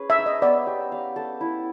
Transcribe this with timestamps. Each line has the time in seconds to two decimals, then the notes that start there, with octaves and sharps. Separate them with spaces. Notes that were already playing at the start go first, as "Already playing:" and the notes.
Already playing: C#4 G#4 B4
0.10 E5
0.18 D#4
0.26 D#5
0.42 B3 D5
0.67 G4
0.92 F5
1.16 A4
1.41 E4